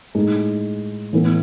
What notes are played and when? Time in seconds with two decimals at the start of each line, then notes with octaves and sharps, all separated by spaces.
0.15 A2 G#3 D#4
1.13 A2 E3 B3